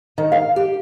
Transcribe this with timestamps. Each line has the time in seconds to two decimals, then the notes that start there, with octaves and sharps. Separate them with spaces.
0.18 D#3
0.32 F5
0.56 G4